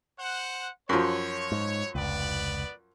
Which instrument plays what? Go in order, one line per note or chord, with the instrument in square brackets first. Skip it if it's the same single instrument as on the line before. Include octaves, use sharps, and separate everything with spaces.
[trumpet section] C5 F#5
[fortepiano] F#2 F3 [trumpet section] C#5
[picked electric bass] G#2
[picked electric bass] F1 C#2 [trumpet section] B3 B4 D5